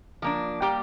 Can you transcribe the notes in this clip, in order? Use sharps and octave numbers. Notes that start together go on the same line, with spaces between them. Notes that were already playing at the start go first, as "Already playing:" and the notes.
F3 A#3 D4
G3 A#3 G4 G5